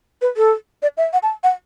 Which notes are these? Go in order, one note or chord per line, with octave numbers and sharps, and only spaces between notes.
B4
A4
D5
E5
F#5
A5
F#5